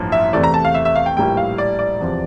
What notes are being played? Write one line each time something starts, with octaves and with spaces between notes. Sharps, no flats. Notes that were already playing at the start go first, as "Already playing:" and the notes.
Already playing: A1 G2 F3 A#3
E5
E2 C3 E3 A3 D5
A#5
A5
F5
E5
E5
F5
G5
A#1 A2 G3 A#3 G5
F5
D5
D5
E2 C3 F3